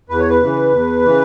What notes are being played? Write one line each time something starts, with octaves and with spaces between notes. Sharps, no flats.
E2 B4
C#5
B4
C#3 E3
E2
C#3 E3